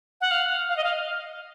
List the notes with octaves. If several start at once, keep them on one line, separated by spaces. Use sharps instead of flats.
F#5
F5
F5
D#5
F5